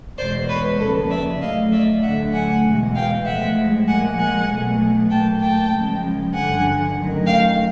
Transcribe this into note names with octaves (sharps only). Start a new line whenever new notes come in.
E2 B2 G#3 C5 D5
B4 C#5
D#2 C#3 F3 A4 B4
D5 E5
A2 F#3 A3 D#5 F5
D5 E5
D2 D3 F#3 A3 E5 F#5
F#5 G#5
E2 B2 G#3
F5 G5
A2 F3 G#3 E5 F#5
A#2 F3 G#3 F#5 G#5
F#5 G#5
B2 F#3 A3
A#2 F#3 A3 G5 A5
G5 A5
F#2 C#3 F3 G#3
G2 D3 F3 F#5 G#5
F#2 D#3 F#3 A3
F5 G5